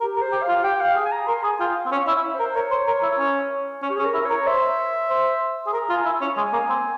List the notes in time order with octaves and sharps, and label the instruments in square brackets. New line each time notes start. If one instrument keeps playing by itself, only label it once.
[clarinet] G4 [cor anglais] A#4
[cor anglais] A#4
[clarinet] C5
[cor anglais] G4
[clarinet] F5
[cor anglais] F4
[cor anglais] G4 [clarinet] G5
[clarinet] F5
[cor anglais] G#4
[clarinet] G#5
A#5
[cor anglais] A#4 [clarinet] C6
[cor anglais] G#4 [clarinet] G#5
[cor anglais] F4 [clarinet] G5
[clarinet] F5
[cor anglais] C4
[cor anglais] C#4 [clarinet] F5
[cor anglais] E4 [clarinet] C#5
[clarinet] E5
C5
[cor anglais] A#4
[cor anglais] A#4 [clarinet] C#5
[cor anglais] C5
A#4
E4
C#4
C#4
[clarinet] G4
G#4
[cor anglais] C#4
[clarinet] A#4
[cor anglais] E4
[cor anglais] A#4 [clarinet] C#5
[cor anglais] C5 [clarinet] E5
[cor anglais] C5
G#4
[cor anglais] A#4 [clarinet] A#5
[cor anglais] F4
[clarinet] G#5
[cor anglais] E4
C#4
[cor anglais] G#3 [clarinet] G#5
[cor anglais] A#3
C4